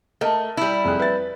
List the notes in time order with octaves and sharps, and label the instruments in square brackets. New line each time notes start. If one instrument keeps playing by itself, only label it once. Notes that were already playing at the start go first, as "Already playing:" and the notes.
[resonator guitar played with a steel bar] A3 [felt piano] A#4 D#5
[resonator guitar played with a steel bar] G3 E4
[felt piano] F1 G#4 F#6
B4 E5 A6